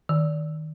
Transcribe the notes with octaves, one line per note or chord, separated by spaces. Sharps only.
D#3